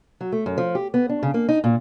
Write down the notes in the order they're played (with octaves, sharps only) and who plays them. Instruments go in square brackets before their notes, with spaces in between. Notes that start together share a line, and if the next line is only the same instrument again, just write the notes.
[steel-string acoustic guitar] F#3
A3
F#2
F3
G4
B3
D4
C#3
A#3
D#4
A#2